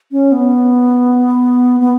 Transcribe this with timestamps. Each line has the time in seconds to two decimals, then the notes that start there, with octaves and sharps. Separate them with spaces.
0.12 C#4
0.32 B3
1.80 B3